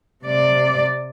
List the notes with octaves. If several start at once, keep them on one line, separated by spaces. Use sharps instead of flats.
C3 D5